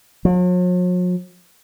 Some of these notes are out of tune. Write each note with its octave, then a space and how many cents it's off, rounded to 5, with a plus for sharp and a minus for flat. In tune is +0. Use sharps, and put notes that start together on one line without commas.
F#3 -45